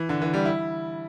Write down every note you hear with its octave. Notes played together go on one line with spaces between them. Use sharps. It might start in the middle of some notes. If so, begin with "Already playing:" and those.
Already playing: E3
D3
E3
G3
E4